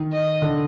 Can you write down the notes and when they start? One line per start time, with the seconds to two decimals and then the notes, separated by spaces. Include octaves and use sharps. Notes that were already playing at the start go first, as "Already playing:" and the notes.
Already playing: D#3
0.12 D#5
0.42 D3